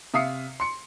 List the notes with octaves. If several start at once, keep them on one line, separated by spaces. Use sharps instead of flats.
C3 E5 F5 D#6 C7 C#7
C6 C#7